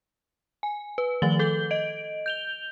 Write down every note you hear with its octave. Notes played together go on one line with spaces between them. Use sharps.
G#5
B4
D#3 F3 A3 A6 F#7 G7
A4 G6 G7
D#5 D7
G6 F7 G7